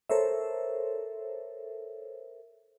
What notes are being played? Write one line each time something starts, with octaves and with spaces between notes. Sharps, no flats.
A4 A#4 C5 C#5 E5